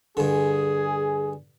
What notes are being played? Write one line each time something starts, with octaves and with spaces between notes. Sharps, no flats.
G2 D3 G#4